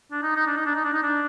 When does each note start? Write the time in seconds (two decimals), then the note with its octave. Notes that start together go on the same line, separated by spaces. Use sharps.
0.12 D4
0.23 D#4
0.36 D#4
0.47 D4
0.57 D#4
0.66 D4
0.75 D#4
0.85 D4
0.94 D#4
1.03 D4